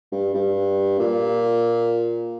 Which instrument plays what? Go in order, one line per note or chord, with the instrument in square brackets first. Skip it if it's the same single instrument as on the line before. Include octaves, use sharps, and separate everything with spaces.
[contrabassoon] G2
G2
A#2